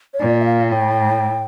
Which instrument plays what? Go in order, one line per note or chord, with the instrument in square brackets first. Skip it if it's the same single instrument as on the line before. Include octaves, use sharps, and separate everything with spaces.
[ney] C#5
[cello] A#2 [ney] D5
[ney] E5
F5
[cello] A2 [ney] G5